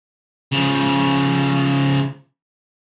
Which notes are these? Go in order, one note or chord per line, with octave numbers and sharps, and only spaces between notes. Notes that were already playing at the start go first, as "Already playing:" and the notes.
C#3 F3